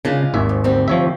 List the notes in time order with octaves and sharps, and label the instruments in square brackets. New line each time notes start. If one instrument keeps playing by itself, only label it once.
[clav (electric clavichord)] C#3 [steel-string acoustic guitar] G#3 D4 F4
[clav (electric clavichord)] G#1 D#2 E5
[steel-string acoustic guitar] G#2
D2 G3 C4
[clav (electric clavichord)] F3 C#5 E5